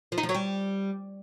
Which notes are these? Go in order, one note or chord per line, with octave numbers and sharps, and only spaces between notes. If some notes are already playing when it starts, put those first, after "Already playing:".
F3
D#4
F3
F#3
G3